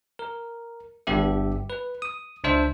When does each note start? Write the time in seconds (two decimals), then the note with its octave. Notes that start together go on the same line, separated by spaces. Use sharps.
0.19 A#4
1.07 G1 G2 B3 G4 E5
1.70 B4
2.02 D#6
2.44 C#2 D4 C5 E5